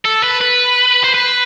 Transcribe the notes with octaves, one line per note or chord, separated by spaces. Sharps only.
A4
B4
B4
C5
B4